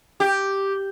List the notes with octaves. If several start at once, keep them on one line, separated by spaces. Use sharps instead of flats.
G4